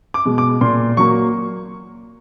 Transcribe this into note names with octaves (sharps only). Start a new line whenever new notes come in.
D6
B2 G#3
D6
A#2 C6
F#3 A#3 C#6